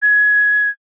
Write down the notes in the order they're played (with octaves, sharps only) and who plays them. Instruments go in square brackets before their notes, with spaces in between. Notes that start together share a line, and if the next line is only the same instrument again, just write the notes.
[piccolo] G#6